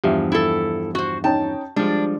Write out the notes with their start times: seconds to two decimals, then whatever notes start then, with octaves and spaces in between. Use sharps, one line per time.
0.04 E2 G2 F3 G4 E5
0.32 E4 A4
0.95 F#4 C5
1.24 C#4 D#4 G5 A5
1.76 F3 G3 G#3 D4